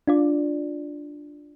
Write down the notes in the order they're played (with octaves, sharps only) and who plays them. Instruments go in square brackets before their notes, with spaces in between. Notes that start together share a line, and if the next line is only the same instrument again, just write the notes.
[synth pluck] D4 F4 D5